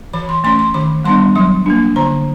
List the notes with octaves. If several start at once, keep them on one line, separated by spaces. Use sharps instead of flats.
E3 B5
C6
A3 C#4 C6
C6
D#3 B5
G3 B3 D4 C6
F#3 C6
A#3 D4
D3 A#5